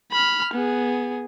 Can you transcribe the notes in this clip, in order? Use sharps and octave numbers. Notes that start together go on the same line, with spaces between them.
B5 F6
B3 G#4